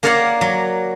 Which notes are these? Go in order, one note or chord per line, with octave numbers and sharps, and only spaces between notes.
A#3 A#4 C#5 D5 F5 F#5
F#3